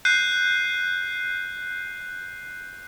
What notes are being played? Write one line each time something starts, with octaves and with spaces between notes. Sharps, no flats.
F#6 G6 C7 D#7